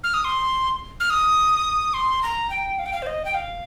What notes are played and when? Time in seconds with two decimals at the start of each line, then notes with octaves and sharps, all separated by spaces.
0.04 F6
0.14 D#6
0.25 C6
1.00 F6
1.10 D#6
1.94 C6
2.23 A#5
2.50 G5
2.79 F5
2.86 G5
2.93 F5
3.02 C5
3.07 D#5
3.25 G5
3.34 F5